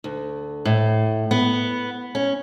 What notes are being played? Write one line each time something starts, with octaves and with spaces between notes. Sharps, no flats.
D2
A2
B3
C#4